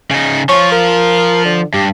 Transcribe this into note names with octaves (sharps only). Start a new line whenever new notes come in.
C#3 D#4
F3 F4 C#5
A#4
D3
G2 G4